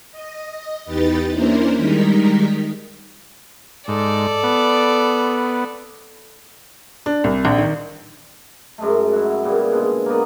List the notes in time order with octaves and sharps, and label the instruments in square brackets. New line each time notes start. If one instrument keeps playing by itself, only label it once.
[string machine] D#5
E2 D#4 G4 B4 A6
A#3 C#4 D4 E4 A#4 C5
D#3 G3 G#3 D#4 A#4 B6
[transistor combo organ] G#2 [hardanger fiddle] A4 D5
[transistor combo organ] B3
[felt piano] D4
C2
A#1
D#3
[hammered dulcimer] F#2 G#3 A3
E4 F#4
A#2 C#3 G3 B3
B2 D3 G#3
A#3 B3 D5 D#5